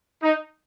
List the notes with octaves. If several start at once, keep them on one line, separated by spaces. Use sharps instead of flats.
D#4